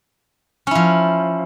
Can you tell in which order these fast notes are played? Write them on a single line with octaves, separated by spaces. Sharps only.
C#4 E4 F3